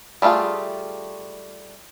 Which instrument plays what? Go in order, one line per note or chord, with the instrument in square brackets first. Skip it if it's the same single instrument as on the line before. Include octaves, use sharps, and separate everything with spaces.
[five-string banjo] G3 A3 C#4 F4 G#4